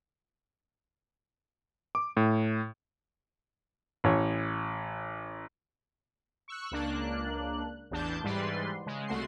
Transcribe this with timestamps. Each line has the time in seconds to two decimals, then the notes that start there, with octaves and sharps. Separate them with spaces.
1.95 D6
2.17 A2
4.04 A1 C#5
6.48 C#6 E6 F#6
6.71 C#2 A#3 D4 F#6
7.91 A1 E2 D4 A5 G6
8.24 G#2 E3 G3 B4 D5 C6
8.86 C#3 G#3
9.07 C2 A3 F#4 C6 C7